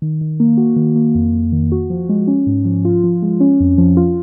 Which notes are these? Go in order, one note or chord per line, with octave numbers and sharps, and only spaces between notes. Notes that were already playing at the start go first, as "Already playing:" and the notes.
D#3
D#3
A#3
F#4
D#3
A#3
F2
F2
D#3
F#4
F3
G#3
C#4
G#2
F3
F4
F3
G#3
C#4
F2
F3
F4